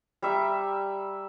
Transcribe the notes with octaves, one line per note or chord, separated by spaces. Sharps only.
G3 E5 A#5